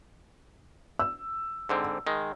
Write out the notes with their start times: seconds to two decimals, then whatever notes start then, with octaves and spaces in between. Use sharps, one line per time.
0.99 E6
1.69 G#2 D3 C4
2.07 D#3 G#3